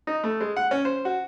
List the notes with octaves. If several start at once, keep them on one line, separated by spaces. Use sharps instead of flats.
D#4
A3
G#3
F#5
C#4
C5
F#4